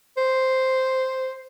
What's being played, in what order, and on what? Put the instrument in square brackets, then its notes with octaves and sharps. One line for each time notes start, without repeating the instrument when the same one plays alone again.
[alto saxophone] C5